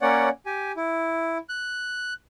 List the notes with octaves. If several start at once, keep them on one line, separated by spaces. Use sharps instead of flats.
A#3 C#4 C#5 D5 F#5
G4 G#5
E4
F#6